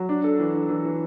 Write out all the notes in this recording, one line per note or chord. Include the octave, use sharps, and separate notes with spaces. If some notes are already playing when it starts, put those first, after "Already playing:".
Already playing: F#3
D4
A4
E3
D4
E3
E3